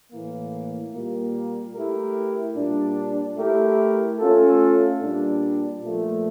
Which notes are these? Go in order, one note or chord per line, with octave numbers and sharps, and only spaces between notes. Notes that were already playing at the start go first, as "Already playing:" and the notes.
A2 E3 A#3
A#2 G3 A#3
A3 E4 G4 A#4
A#2 G3 D4
A3 E4 G4 A#4
A3 C#4 F4 A4
A#2 G3 D4
A#2 F3 A3